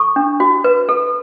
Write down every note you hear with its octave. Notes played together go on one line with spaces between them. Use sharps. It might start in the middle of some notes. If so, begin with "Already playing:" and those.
Already playing: A4 C#6
D4
F#4
B4
A4